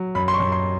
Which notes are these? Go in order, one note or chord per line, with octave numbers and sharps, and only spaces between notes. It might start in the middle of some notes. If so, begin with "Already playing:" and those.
Already playing: F#3
F#2 B5
C6
C#6
F#2
C6